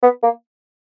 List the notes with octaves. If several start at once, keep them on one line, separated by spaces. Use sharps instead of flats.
B3
A#3